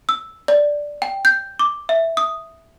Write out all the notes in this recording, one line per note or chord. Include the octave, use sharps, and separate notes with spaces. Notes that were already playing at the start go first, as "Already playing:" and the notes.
E6
D5
G5
G6
D6
E5
D#6